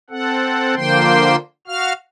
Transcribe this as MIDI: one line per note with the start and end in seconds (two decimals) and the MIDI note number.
0.10 0.75 60
0.10 0.75 69
0.10 0.75 78
0.76 1.36 50
0.76 1.36 53
0.76 1.36 58
0.76 1.36 72
0.76 1.36 79
0.76 1.36 84
1.67 1.93 66
1.67 1.93 77
1.67 1.93 89